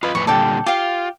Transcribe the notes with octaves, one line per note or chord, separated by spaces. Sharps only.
F4 B4 D#5 F5
F2 A2 B4 C#6
A#2 D3 G3 A4 D5 G5
F4 G4 F5